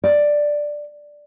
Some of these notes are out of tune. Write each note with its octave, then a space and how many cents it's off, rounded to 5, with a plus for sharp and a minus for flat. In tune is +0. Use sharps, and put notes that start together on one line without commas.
D5 +5